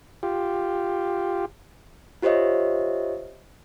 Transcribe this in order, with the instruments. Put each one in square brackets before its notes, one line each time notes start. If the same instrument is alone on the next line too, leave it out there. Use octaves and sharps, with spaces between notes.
[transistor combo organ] F4 G4
[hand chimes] F4 G4 C5 C#5 D#5 E5